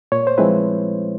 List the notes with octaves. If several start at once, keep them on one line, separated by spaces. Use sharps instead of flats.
A#2 C#5
C5
F3 G#3 C4 E4 B4